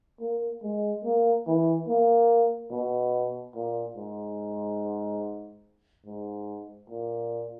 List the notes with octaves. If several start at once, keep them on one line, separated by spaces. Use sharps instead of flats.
A#3
G#3
A#3
E3
A#3
B2
A#2
G#2
G#2
A#2